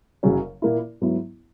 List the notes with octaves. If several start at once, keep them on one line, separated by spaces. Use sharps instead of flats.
F#1 F#2 C#3 F#3 C#4
A#2 A#3 E4
G#2 F#3 B3 E4